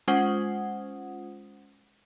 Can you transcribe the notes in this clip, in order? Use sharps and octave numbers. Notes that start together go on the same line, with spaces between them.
G#3 C#4 F4 C5 F#5 D#6